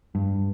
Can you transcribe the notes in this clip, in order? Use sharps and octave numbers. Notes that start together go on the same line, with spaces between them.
G2